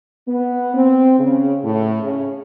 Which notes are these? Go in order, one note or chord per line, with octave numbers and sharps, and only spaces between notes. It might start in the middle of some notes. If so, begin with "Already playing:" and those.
B3
C4
C#3
A2
C#3